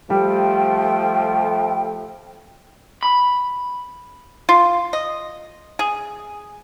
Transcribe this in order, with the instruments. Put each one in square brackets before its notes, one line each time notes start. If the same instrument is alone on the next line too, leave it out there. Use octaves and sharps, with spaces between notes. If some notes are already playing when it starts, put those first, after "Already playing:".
[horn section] F3 A3 [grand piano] G3 [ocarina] G5
[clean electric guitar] B5
[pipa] F4
D#5
G#4